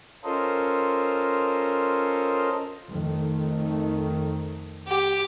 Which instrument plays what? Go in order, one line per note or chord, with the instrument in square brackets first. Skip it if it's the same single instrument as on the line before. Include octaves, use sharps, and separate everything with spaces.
[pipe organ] C#4 F4 A4 A#4 C5 D#5
[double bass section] F2 D#3 A3
[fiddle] G4